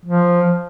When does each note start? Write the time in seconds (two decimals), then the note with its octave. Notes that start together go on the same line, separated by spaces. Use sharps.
0.05 F3